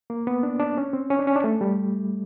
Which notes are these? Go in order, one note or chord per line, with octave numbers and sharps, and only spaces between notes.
A#3
B3
D4
D4
C#4
C4
C#4
D4
C#4
D4
A3
G3